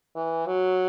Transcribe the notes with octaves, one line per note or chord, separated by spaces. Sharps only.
E3
F#3